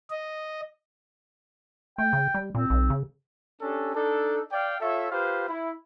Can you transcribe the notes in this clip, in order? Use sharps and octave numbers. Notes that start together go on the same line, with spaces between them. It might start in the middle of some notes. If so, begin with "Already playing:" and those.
D#5
A3 G5
C#3
G3
A#2 C4
B1
C#3
C#4 D4 G4 A4
D4 D#4 A4
D5 F5 G5
F4 A4 C#5 E5
F4 G4 B4 C5 F5
E4